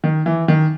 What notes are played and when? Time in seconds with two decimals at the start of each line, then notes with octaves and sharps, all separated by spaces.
0.04 D#3
0.26 E3
0.48 D#3